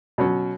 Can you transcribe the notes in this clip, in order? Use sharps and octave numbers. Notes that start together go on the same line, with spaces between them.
B2 F#3 C#4